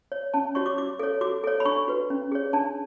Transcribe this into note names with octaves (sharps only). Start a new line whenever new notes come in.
C#5
C#4 A5
F#4 C#5 C#6
D6
F#4 D6
A4 C#5
F#4 D6
A4 C#5
B5
D4 C#6
F#4 B4
C#4
G#4 C#5
D4 A5